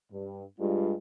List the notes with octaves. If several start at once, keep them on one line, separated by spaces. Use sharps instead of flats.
G2
G2 G3 G#3 F4